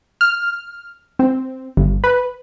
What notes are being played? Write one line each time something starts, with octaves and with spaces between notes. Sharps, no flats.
F6
C4
G1
B4